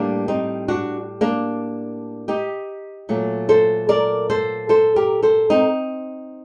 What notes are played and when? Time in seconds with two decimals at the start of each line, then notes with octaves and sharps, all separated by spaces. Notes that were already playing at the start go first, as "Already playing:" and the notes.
Already playing: A2 G3 A#3 D4
0.28 C4 D#4
0.68 D4 F#4
1.21 A#3 D4
2.28 D#4 G4
3.09 A#2 F#3 A3
3.49 A4 C5
3.89 A#4 D5
4.30 A4 C5
4.69 A4 C5
4.96 G4 A#4
5.22 A4 C5
5.50 C4 D#4